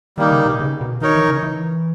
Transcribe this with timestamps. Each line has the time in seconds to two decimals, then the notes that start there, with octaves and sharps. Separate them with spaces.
0.18 D#3 G3 A#3 D#4
0.32 C#3
0.46 B2
0.60 C#3
0.81 B2
1.01 D#3 D#4 A#4 C#5
1.15 E3
1.29 C#3
1.43 E3